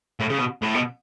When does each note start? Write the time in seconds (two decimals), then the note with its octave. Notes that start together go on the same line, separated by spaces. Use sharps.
0.20 A2
0.30 C#3
0.38 B2
0.62 A2
0.75 B2